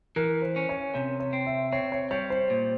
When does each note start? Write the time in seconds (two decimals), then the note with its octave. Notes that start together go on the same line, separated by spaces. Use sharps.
0.16 E3 A#4
0.42 C5
0.56 C#4
0.69 C#5
0.94 C3 C#5
1.20 C#5
1.33 C4
1.46 E5
1.72 C4 C#5
1.92 C#5
2.11 G3 C#5
2.30 C5
2.50 A#2